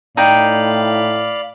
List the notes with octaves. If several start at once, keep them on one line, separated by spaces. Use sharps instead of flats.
A2 D#4 D5 F5 G5 B5